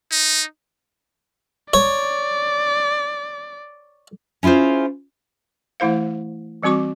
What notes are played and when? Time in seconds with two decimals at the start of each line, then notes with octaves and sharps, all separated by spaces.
0.11 D#4
1.74 C#5 D5
4.43 C#4 E4 F4 G#4 C5
5.80 E3 A3 E4 C5 F5
6.63 E3 G3 C4 F#4 C#6 D6